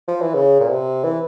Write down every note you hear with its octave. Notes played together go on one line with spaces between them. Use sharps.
F3
E3
C#3
A#2
C3
E3